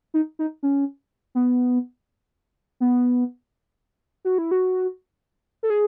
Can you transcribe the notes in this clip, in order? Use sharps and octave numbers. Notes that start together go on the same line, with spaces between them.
D#4
D#4
C#4
B3
B3
F#4
E4
F#4
A4
G#4